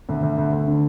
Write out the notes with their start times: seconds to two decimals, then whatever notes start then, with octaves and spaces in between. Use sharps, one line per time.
0.09 D2
0.23 D2
0.38 D2
0.53 D2
0.67 D3